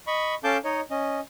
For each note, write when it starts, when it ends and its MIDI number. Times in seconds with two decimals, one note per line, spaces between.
0.07 0.35 75
0.07 0.35 83
0.07 0.35 85
0.44 0.58 61
0.44 0.58 69
0.44 0.58 77
0.44 0.58 81
0.44 0.58 86
0.44 0.58 91
0.65 0.81 63
0.65 0.81 73
0.65 0.81 75
0.91 1.20 61
0.91 1.20 75